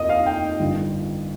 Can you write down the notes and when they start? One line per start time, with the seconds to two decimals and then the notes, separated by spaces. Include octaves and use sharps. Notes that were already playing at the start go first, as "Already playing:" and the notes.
Already playing: F1 D#2 D#5
0.09 F5
0.26 G5
0.60 G1 D3